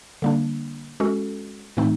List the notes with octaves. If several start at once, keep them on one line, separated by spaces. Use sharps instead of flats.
D3 G3 A#3 D4
G#3 C#4 F#4 A4
A2 E3 A3 C4 D#4